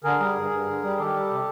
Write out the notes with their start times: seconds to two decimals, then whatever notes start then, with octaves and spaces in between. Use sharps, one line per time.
0.04 D3 G#4 A#4
0.20 G3
0.36 G2
0.51 G2
0.66 D3
0.83 G3
0.98 D#3 G4 A4
1.14 G3
1.30 C3